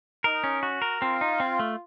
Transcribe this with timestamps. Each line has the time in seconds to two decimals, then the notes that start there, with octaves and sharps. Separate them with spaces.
0.24 D#4 A#4
0.44 C#4
0.63 F#4
0.82 A#4
1.01 C4 F4
1.21 D#4
1.40 C4
1.59 A3